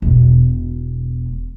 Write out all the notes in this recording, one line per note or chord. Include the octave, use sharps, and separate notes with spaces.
E1 B2